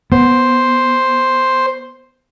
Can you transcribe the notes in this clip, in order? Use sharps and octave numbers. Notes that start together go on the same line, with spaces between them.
B3 C5